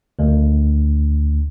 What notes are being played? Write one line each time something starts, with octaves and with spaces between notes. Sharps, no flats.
D2